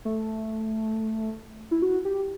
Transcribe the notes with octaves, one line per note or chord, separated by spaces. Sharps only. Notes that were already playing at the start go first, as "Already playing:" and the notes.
A3
E4
F#4
G4